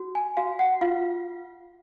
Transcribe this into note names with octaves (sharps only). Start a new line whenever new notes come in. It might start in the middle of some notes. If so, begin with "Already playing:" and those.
Already playing: F#4
G#5
F#4 F5
F#5
F4 F5